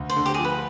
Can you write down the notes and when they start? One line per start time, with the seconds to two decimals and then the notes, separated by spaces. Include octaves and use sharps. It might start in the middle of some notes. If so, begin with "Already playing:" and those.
Already playing: D2
0.09 C5
0.16 D3
0.26 G4
0.34 F3 G#4
0.44 B4